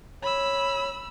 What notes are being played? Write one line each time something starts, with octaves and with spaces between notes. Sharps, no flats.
C#5 B5 E6